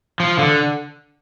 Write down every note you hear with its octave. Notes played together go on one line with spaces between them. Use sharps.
F3
D3